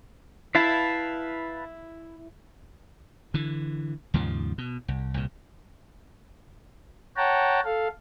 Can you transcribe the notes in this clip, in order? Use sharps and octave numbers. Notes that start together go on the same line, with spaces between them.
E4 B4 F5 A5
D3 E3
D#2 G#2 C#3 F3
B2
C2
C2 A#2
C#5 F#5 G5 A5 A#5
A4 F5